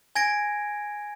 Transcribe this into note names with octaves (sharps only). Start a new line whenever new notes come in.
G#5 G#6 A#6 D7